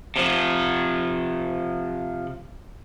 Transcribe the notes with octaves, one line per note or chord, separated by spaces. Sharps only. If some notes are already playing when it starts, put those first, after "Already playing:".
C3 F3